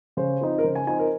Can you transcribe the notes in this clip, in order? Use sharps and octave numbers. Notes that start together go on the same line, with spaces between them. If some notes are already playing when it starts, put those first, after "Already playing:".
C#3 C5
F3 C4 D#4
A#4
C#3 C5
G#5
F3 C4 D#4 G#5
A#4